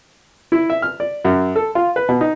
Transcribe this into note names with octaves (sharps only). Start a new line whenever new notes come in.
E4
E5
F6
D5
F#2
A4
F4
B4
B2
D#4